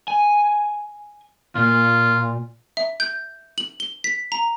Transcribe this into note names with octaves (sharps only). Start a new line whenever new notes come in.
G#5
A#2 F4
E5
G6
F#7
G7
B6
A#5